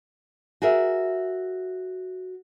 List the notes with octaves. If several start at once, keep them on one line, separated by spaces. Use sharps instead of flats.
F#4 G#4 A#4 E5